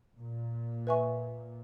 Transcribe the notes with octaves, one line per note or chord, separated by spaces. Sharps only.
A#2
B4 E5 G#5 C#6